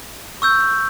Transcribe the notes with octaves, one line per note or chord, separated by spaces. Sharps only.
C#6 E6 G6